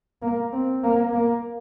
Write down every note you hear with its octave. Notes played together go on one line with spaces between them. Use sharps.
A#3
C4
A#3
A#3